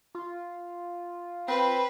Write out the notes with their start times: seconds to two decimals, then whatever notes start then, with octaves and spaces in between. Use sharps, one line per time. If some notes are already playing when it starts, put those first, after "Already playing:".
0.15 F4
1.48 C4 B4